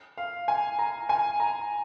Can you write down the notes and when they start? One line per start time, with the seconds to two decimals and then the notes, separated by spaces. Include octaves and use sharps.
0.18 F5
0.48 G#5
0.79 A#5
1.09 G#5
1.40 A#5